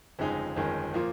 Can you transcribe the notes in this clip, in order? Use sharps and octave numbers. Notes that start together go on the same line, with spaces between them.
G1 F2 C#3 G#3 D#4
G1 F2 D#3 G#3 C#4
A#2 F3 A#3